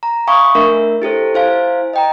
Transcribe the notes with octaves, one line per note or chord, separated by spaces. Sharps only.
A#5
E5 F5 G#5 B5 C#6 D#6
A3 D4 A#4 E5
E4 G4 A4 C5
E4 C5 F5 G#5
D#5 G5 A#5